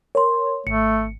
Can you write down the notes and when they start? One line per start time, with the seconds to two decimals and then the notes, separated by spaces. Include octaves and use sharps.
0.15 A#4 C#5 C6
0.67 G#1 A3 C#7